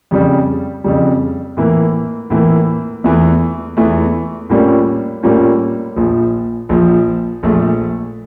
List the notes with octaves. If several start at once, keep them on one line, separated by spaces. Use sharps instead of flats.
F2 C#3 G3
F2 C#3 G3
A2 E3 A#3
A2 E3 A#3
E2 E3 A3
E2 E3 A3
A2 G3 A#3 C#4 F4
A2 G3 A#3 C#4 F4
A#1 A#2 F3
A#1 A#2 F3
A#1 A#2 A3